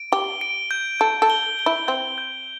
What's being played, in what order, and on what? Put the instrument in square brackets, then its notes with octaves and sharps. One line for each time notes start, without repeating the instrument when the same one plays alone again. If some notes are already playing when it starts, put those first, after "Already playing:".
Already playing: [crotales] D7
[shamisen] G4 [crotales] G7
[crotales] D7
G6
[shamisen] A4 [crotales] G6
[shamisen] A4
[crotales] G7
G7
[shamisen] E4
[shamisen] C4 [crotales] G6
[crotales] G6